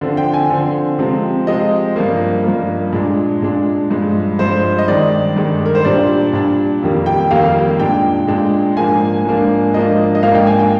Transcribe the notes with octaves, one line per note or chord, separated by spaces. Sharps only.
D3 F3 C4
G5
G#5
D3 F3 C4
C3 F3 G#3 C4
C3 F3 G#3 C4 D#5
G2 F3 A#3
G2 F3 A#3
A#2 G#3 D4
A#2 G#3 D4
G2 F3 G#3
G2 F3 G#3 C5
D#5
G2 D#3 G#3 D5
G2 D#3 G#3
A#4
C5
A#2 G3 D4 D5
A#2 G3 D4
F2 D#3 G3 A#3
G5
F2 D#3 G3 A#3 F5
A#2 G#3 D4 G5
A#2 G#3 D4
G#2 F3 A#3 D4 G#5
G#2 F3 A#3 D4
G#2 F3 A#3 D4 D#5
D#5
G#2 F3 A#3 D4 F5
G5
G#5
G5